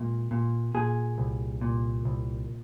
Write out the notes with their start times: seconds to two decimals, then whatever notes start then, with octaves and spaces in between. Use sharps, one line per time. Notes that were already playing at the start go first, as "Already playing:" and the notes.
Already playing: A#2 G#3
0.31 A#2
0.74 A#2 G#4
1.18 C2
1.61 A#2
2.05 C2